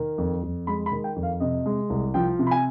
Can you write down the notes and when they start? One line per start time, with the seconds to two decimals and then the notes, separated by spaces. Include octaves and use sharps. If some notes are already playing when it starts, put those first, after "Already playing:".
Already playing: D#3
0.18 F2
0.43 F2
0.67 G#3 B5
0.86 B5
0.92 D#3
1.04 G5
1.16 F2
1.23 F5
1.40 C3 D#5
1.66 G#3
1.90 C2
2.14 F3 G5
2.39 C3
2.47 B5
2.51 G#5